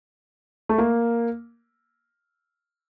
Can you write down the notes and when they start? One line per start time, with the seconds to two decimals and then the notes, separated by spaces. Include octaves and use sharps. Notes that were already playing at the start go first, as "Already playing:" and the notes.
0.69 A3
0.78 A#3